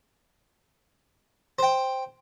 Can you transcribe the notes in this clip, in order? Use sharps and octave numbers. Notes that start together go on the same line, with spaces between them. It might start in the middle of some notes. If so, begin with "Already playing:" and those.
C5 G5